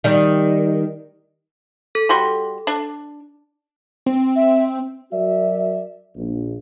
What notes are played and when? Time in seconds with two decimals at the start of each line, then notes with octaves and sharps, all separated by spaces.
0.04 D#3 G3
1.95 A4
2.09 G3 F#4 C6
2.67 D4
4.06 C4
4.36 E5
5.11 F#3 F#4 A#4 D5 E5
6.15 A#1